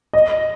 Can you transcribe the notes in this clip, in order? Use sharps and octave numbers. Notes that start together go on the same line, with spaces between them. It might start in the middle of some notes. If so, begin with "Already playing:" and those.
D#5